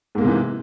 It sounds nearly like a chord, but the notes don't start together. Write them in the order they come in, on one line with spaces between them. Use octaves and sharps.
G#2 A#3 G#3 C3 E3